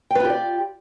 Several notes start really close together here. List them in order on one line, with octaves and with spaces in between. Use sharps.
G5 B4 F4 G4 D5